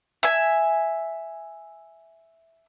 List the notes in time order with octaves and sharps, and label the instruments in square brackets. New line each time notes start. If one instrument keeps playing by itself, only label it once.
[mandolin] E5 G#5